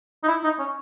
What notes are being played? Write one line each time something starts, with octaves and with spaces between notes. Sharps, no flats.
D#4
E4
D#4
C#4